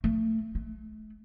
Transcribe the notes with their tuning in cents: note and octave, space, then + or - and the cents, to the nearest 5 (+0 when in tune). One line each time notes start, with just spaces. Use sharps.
A3 +20
A3 -35